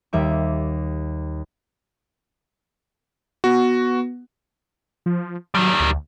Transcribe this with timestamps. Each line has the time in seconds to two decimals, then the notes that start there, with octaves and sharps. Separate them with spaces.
0.13 D#2 G3 E5 D6
3.44 B3 F#4
5.06 F3
5.55 D#3 F#3 G3
5.80 D2